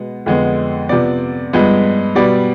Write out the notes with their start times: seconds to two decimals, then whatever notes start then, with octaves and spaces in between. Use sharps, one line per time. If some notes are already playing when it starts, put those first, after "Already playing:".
Already playing: B2 G#3 B3
0.26 F2 D3 G#3 B3
0.89 C3 F3 B3 D5
1.53 G2 F3 G#3 B3
2.15 B2 G3 B3 D5